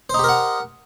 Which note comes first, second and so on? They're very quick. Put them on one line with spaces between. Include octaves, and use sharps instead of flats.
C5 D#4 G4 A#4 F#5